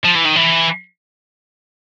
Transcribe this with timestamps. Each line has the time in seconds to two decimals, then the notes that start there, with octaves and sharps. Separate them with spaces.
0.05 F3
0.15 E3
0.25 D#3
0.36 E3